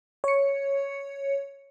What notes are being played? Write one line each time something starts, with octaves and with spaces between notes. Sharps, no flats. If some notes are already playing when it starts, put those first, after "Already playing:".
C#5 C#7